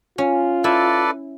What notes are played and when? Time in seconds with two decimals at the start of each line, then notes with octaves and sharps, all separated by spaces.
0.18 C#4 F4
0.64 E4 A4 B4 D5